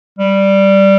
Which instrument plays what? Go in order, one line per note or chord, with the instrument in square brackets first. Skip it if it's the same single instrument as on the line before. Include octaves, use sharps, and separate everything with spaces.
[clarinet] G3